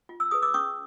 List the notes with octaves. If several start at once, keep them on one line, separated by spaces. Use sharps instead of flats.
F4
E6
G#4 B4 D#6
D6 E6
C#4 C#6 D#6